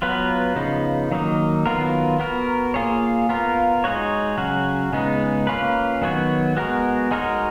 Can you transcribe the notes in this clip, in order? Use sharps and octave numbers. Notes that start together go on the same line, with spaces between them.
F#3 B3 F4 B4
C#3 F3 B3 D#4
D#3 F#3 A#3 D#4
D#3 F#3 B3 F4 A#4
B3 F#4 A#4
A#3 F4 G#4 C#5
B3 F4 A#4
G#3 D#4 F#4 C#5
C#3 F#3 C#4 F#4
C#3 G#3 B3 D#4
A#3 C#4 F4 B4
D#3 F#3 B3 F#4 C#5
G#3 B3 F#4 A#4
G#3 D#4 F#4 A#4 C#5